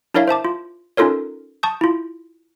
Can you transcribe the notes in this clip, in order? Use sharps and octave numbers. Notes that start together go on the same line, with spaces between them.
D4 E4 A#4 C#5 E5 F5
C5 E5 A5 D6
F4
C#4 D#4 F4 A4 A#4 C#5
A5 C#6 D#6 G6
E4 F4